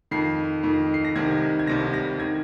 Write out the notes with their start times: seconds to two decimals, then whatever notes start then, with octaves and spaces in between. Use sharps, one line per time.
0.11 F2 D#3 C7
0.63 F2 D#3
0.94 C7
1.05 A#6
1.16 C2 C3 D#3 G#6
1.59 G#6
1.67 C2 C3 D#3 A#6
1.94 A#6
2.20 D#3 G#6